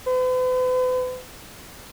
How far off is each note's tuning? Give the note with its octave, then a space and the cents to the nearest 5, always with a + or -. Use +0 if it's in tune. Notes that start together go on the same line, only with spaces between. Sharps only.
B4 +45